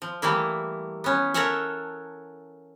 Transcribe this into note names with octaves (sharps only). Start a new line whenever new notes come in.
F3
E3 G3 A3 A#3 E4
B3 C#4
A4 A#4 C#5 E5 F#5 G#5